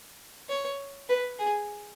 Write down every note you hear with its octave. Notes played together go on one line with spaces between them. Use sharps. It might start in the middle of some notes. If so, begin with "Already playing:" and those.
C#5
B4
G#4